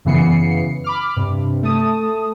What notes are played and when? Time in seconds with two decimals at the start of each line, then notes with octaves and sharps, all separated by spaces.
0.05 F#2 C#3 E3 B3 C7 C#7
0.84 B5 D6 F6
1.16 G2 C3
1.63 A3 A5 D#6